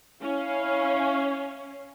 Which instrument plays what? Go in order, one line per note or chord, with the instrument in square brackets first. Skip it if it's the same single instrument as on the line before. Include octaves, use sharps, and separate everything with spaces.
[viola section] C#4 [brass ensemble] E4 F5